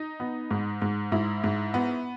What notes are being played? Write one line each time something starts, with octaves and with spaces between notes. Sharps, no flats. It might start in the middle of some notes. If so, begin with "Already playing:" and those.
Already playing: D#4
B3
G#2
G#2
G#2 E4
G#2
B3